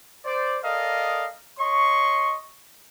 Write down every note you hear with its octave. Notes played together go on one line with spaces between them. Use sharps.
C5 D5
A4 A#4 D5 D#5 F5 D#6
C#5 D#5 C6 C#6